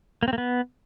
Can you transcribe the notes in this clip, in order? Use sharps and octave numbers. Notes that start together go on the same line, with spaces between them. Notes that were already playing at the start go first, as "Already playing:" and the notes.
A#3
C4
A#3
B3